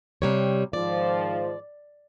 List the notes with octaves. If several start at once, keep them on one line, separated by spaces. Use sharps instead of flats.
C3 G3 C#5
G#2 D#3 F3 D5